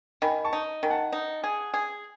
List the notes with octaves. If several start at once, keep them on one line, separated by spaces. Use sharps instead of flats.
D#3 G#5 B5
A5 C#6
D#4
D#3 G#5
F#5 A5
D#4
G#4
G#4